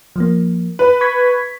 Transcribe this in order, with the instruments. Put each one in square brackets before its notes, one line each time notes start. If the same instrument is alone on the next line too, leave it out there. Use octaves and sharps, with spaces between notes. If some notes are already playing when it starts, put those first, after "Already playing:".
[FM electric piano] F3 A#3
[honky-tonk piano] B4
[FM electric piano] C#6 G#6 B6